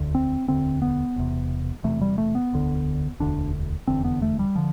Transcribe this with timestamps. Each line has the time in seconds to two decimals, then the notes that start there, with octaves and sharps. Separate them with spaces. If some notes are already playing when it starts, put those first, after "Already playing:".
Already playing: E1 D2 D3
0.15 C4
0.48 E1 D2 D3 C4
0.82 B3
1.16 E1 E2 C3
1.83 E1 E2 C3 A3
2.01 G3
2.18 A3
2.35 B3
2.53 E1 D2 D3
3.20 E1 D2 D3 D4
3.88 F1 E2 D3 C4
4.05 B3
4.22 A3
4.39 G3
4.56 D3 F3